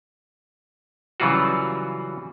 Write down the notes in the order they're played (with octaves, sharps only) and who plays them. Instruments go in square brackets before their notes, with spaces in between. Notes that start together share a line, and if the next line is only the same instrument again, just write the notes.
[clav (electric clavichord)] C#3 E3 F#3 G3 F4 F#4